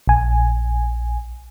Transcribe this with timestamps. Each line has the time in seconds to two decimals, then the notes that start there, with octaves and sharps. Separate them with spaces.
0.07 A#1 G#5